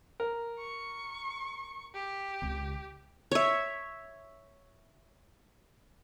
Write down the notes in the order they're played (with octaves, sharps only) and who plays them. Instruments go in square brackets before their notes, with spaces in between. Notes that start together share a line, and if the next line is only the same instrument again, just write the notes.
[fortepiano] A#4
[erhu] C#6
G4
[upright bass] C#2 C#3
[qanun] C#5 E5